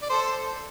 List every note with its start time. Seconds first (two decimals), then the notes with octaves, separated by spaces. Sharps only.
0.02 D5
0.09 A4 C5